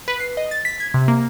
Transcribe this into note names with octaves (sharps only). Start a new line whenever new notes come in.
B4
C7
D#5
A6
B6
G#6
C3
A#3